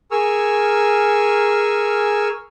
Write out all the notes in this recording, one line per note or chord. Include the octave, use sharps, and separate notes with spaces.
G#4 A#4 G#5 C#6 E6 F6